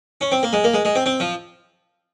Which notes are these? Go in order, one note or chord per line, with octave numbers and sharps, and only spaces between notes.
C#4
C4
A#3
G#3
A#3
G#3
G#3
C4
C4
F3